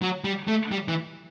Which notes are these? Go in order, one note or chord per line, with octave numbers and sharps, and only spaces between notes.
F#3
G3
A3
G3
E3